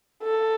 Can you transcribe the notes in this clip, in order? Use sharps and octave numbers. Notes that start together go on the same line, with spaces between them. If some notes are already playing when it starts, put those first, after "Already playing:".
A4